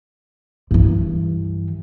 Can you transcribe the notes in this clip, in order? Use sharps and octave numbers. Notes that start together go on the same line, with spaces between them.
G2 E3